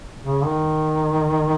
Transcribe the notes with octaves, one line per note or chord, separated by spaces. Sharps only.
C#3
D#3